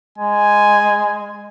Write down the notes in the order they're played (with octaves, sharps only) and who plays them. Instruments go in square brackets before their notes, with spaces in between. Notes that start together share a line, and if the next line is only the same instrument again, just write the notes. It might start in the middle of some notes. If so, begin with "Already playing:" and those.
[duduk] G#3 [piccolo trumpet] G#5